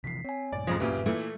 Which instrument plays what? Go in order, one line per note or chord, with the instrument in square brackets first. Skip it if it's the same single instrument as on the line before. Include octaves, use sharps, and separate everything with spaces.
[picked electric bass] C3 E3 F3 [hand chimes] B6 C7
[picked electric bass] C4 [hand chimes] C#5 G#5
[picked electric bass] F#2 A2 C3 [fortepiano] D5
[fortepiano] F2 C#3 G#3 [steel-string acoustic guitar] F3
[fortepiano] A#2 C#3 F#3 [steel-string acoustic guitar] G4 [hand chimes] B4 E5
[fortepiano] A#2 E3 [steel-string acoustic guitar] A3